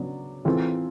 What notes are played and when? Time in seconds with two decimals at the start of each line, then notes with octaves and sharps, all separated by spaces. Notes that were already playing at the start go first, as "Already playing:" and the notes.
Already playing: C#3 F#3 B3 D4
0.45 E3 G#3 C4 F4 A4